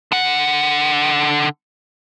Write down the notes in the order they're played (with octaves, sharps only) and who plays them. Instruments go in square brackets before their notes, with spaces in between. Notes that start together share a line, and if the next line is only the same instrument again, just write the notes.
[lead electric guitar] D3 F#5